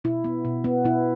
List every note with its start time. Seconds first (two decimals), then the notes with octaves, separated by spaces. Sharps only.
0.04 B2 E4
0.24 B3
0.45 B2
0.64 B3
0.85 B2 E4